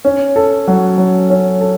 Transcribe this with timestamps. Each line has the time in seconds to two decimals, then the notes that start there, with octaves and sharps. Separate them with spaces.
0.05 C#4
0.36 A4
0.68 F#3
0.98 F#3
1.30 C#4
1.61 A4